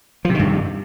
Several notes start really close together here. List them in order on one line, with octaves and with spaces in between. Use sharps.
F3 C3 D#3 G2